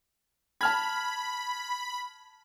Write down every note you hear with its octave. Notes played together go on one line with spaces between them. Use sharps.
A5 B5 F6 G#6